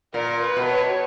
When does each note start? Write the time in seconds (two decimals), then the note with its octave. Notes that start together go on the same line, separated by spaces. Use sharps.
0.14 A#2 A#4
0.43 B4
0.57 B2
0.71 C#5